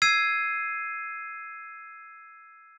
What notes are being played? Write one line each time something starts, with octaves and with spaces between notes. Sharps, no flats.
E6 G#6 C7 D#7